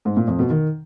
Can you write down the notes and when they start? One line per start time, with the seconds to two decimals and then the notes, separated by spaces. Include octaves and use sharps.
0.05 G#2
0.16 A#2
0.28 F2
0.39 B2
0.50 D#3